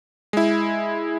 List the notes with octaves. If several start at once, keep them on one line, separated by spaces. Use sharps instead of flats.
G#3 E4